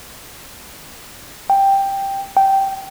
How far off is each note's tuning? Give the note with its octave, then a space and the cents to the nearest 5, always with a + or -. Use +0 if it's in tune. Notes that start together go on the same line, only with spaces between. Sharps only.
G5 +5
G5 -10